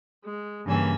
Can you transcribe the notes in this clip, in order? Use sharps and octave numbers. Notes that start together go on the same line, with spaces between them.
G#3
G2 C#3 E3 A#3 G#5 E6